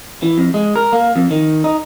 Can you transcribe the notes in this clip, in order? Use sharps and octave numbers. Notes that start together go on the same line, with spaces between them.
E3
F2
G#3
A#4
A#3
F2
D#3
D#4